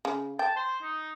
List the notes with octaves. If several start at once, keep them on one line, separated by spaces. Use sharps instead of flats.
C#3
G5 A5
C5
D#4